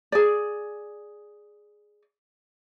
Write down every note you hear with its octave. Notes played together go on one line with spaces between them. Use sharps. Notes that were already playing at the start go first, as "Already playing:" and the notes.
G#4 D5